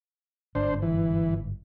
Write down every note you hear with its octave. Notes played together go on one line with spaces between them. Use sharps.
G1 G#2 D4 C5
E3